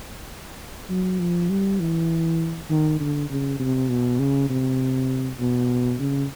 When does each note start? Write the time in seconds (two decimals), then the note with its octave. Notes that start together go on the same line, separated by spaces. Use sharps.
0.90 F#3
1.20 F3
1.50 G3
1.80 E3
2.70 D#3
3.00 D3
3.30 C#3
3.60 C3
3.89 B2
4.19 C#3
4.50 C3
5.40 B2
6.00 C#3